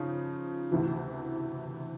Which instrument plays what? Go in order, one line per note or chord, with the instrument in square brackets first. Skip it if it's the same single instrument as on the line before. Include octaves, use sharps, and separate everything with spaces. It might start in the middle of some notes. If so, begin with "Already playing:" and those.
Already playing: [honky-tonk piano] C#3 F3 D#4
D2 C3 E3